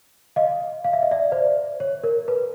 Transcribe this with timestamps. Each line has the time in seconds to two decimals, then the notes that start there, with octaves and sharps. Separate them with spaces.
0.36 D#5 F5
0.84 F5
0.93 E5
1.03 D#5
1.11 D5 E5
1.32 C5 D5
1.80 C#5
2.04 A#4
2.28 B4